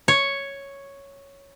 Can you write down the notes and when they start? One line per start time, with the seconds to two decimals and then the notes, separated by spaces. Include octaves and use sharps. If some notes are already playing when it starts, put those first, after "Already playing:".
0.08 C#5